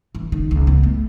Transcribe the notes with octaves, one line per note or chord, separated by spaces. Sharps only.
E3
D#3
C#2
B3
A3